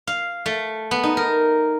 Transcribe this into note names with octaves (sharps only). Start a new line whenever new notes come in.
F5
A3
B3
D#4
A#4